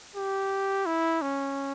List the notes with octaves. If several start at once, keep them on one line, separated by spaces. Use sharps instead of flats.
G4
E4
C#4